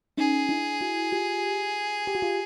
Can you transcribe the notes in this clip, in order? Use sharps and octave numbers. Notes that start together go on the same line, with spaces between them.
C#4 D#4 G#4
D4 E4
E4 F#4
F4 G4
G4
F#4
F4 G4